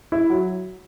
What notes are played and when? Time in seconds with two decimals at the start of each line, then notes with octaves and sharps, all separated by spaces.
0.12 E4
0.30 F#3